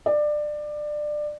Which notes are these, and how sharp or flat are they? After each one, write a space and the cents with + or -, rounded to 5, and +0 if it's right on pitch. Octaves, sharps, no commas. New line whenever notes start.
D5 +20